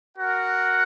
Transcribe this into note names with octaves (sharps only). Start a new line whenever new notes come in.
F#4 A#4 F#5